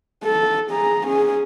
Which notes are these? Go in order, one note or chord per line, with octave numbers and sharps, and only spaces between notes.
A4
G#4 A#5
C#4 G#4